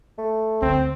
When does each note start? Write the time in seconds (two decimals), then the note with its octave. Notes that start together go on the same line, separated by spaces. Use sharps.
0.18 A3
0.62 D2 C4